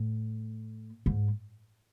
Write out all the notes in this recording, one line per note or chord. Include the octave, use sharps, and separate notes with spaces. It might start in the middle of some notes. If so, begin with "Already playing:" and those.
Already playing: A2
G#2